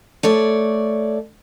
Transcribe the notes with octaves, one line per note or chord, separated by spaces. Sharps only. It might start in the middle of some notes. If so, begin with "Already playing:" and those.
A3 C#5 D5